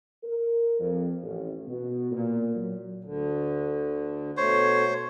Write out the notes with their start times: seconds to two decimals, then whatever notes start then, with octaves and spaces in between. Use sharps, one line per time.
0.23 A#4
0.80 F2
1.23 A1
1.67 B2
2.12 A#2
2.56 F#3
3.04 D2 D3
4.37 B2 A3 C5 C#5